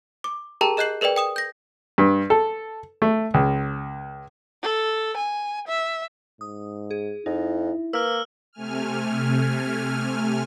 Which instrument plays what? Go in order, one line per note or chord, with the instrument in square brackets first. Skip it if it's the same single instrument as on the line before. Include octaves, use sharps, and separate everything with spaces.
[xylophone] D6
G4 G#4 A#4 G5 A5 A#5
G#4 D#5 F#6 G6 C7 F#7
G#4 A#4 B4 D5 G5
G5 D#6 E7
G6 A#6
[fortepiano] G2
A4
A3
C#2
[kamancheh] A4
G#5
E5
[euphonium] G#2 [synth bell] D#6
[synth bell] G#4
[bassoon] F2 [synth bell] D#4 [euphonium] E4
[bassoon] A#3 [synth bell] B4 [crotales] E6 F6
[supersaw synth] C3 A3 G#5 F6